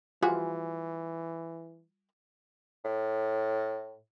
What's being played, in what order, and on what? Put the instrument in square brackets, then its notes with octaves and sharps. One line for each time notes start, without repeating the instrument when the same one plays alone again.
[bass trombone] E3 [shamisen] G3 F#4 G#4 [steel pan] F4
[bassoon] A2